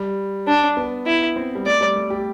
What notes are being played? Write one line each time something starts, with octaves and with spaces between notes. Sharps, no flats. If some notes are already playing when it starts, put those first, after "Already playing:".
Already playing: G3
D4
B3
E4
C4
G3
A3 D5
G3
A3
G4